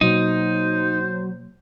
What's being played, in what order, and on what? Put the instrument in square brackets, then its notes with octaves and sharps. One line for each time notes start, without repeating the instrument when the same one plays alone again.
[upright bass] B2 A#3 [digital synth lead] F#3 [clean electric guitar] D#4 [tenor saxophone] C5